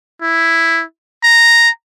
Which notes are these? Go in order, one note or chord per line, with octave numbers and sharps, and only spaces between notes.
E4
A#5